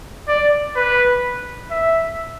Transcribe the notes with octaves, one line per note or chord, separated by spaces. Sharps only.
D5
B4
E5